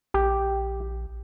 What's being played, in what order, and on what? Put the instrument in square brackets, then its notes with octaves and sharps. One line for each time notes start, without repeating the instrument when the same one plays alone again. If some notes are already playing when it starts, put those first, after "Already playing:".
[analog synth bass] A#1 [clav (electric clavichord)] G4